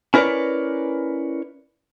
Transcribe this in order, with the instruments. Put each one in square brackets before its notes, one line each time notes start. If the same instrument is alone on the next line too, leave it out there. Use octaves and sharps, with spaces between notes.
[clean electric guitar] C#4 E4 A#4 B4 C#5 D5